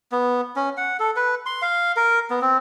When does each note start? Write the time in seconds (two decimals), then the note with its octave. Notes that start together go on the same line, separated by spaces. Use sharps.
0.12 B3
0.56 C#4
0.77 F#5
1.00 A4
1.16 B4
1.46 C6
1.62 F5
1.96 A#4
2.30 B3
2.41 C4